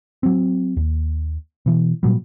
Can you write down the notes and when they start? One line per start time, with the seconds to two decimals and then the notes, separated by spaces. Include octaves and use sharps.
0.23 F#3 C4
0.77 D#2
1.66 B2 E3
2.03 A#2 F#3 G3